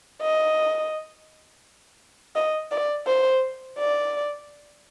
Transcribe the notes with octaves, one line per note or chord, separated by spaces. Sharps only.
D#5
D#5
D5
C5
D5